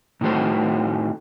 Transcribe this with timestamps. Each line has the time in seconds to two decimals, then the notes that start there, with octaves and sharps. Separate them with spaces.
0.21 A2 D#3 A3 F#4 C5